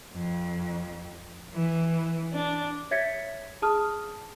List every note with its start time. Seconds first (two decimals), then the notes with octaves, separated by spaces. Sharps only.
0.14 F2
1.54 E3
2.32 D4
2.91 C#5 E5 G#6 A6 B6 C#7
3.62 G#4 A5 D#6 F6